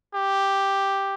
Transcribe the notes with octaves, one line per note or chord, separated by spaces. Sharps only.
G4